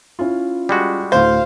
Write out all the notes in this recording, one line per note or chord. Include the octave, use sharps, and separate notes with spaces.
C#4 E4 F4
G3 G#3 F#4
D2 A2 C5 F5